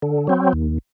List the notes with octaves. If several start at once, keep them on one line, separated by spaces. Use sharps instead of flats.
D3
F#3 C4
D#2